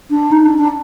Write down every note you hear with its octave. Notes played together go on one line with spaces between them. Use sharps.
D4
D#4
D4
D4